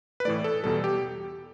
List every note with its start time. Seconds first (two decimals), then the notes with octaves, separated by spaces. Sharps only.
0.20 B4
0.25 A2 E3 A3 D5
0.44 A4
0.64 E2 B2 G3 A4
0.84 G4